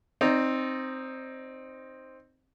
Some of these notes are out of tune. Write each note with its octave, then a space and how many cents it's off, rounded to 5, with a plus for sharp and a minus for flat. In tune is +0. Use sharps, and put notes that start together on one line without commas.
C4 +5 D#4 -5 D5 -25